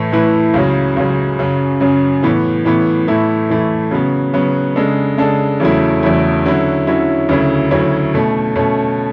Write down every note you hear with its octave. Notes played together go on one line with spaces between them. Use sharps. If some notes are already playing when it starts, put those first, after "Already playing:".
Already playing: A2 E3 A3 E4 B4
A2 E3 A3 E4 B4
C#2 C#3 F#3
C#2 C#3 F#3
F#2 C#3 F#3
F#2 C#3 F#3
A2 E3 B3
A2 E3 B3
A2 E3 A3 E4
A2 E3 A3 E4
C#3 F#3 B3
C#3 F#3 B3
C#3 G#3 D4 A4
C#3 G#3 D4 A4
E2 C#3 F#3 A3 E4
E2 C#3 F#3 A3 E4
D3 F#3 C#4 E4
D3 F#3 C#4 E4
D2 C#3 F#3 C#4 E4
D2 C#3 F#3 C#4 E4
B2 A3 C#4
B2 A3 C#4